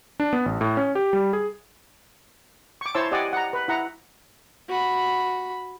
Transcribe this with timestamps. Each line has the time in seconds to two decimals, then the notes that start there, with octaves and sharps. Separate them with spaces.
0.20 D4
0.33 B3
0.46 A1
0.61 A2
0.77 C#4
0.95 G4
1.13 G3
1.33 G#4
2.81 C#6 D6
2.95 E4 C5 C#5 A5 C6 E6
3.11 G4 D5 D#5 F#5 G#5
3.33 F#5 A#5
3.53 B4
3.68 E4 F#5 A#5
4.69 F#4 B5